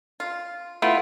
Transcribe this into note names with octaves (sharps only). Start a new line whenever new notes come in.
F4
A3 B3 E4 F4